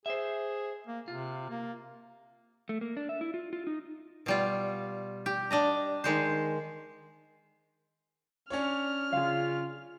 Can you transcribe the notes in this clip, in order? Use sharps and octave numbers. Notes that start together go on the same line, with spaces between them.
G#4 C5 E5
A#3
C3 F4
A#3
A3
A#3
D4
E5
E4
F4
F4
D#4
B2 G3 F4
G4
D4 D#5 A#5
D#3 G#3 C5
C#4 D4 C#5 F6
C#3 F4 G#4 F5